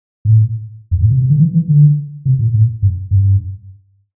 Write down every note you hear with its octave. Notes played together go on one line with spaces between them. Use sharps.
A2
F2
A2
C3
C3
D3
E3
E3
D3
C3
A#2
A2
G2
G2